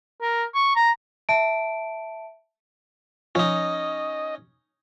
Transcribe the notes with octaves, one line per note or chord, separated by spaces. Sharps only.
A#4
C#6
A#5
E5 A5 D7
F3 C#4 D#4 D#5